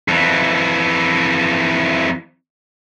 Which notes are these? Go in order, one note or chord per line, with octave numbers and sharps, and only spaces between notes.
F2 E3